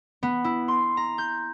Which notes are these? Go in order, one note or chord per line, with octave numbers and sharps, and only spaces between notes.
B3
E4
C6
A#5
G6